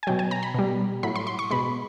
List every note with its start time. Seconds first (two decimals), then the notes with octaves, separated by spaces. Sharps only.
0.03 G#5
0.07 B2 F#3 G5
0.19 G#5
0.31 A#5
0.43 B5
0.54 B2 G3
1.03 A2 F#3 B5
1.16 C6
1.27 C6
1.39 C#6
1.50 B2 G#3 B5